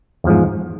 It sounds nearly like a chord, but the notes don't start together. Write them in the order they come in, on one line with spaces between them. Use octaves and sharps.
E2 F3 G#2